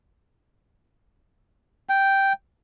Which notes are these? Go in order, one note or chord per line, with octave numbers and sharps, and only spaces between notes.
G5